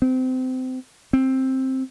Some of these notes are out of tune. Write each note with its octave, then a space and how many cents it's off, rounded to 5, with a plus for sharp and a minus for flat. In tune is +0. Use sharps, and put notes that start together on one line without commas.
C4 -25
C4 +10